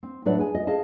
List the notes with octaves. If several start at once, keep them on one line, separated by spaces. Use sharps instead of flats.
C4
A2 F#3 D4 B4 D5 F#5
G#4 G#5
D#5
G#4 D#5 F5 A5